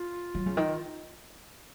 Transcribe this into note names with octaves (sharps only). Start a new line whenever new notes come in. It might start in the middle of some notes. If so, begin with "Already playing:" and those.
Already playing: F4
F#3
C#3
D#3